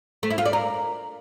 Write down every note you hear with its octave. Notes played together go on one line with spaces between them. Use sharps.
A3
E4
F4
D5
A#4